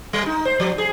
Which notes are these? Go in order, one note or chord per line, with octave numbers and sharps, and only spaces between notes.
G3
D#4
C5
F3
G#4